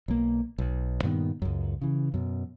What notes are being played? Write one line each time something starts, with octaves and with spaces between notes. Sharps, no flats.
B1 A#3
B1
G2 A#2 D#3 B3
C#2 F#2
C#3 E3
F#2 B2